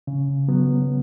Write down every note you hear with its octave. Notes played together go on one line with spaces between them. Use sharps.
C#3
F#3 B3